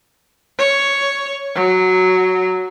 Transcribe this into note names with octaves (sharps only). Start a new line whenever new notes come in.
C#5
F#3